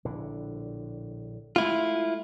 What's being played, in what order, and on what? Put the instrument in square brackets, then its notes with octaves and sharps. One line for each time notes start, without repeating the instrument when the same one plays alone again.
[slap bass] A#1 A2 D3
[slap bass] G#3 A3 [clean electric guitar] E4 F4